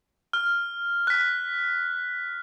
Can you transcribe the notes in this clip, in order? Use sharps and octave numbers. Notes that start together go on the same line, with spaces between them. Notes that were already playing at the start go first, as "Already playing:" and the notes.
F6
F#6 B6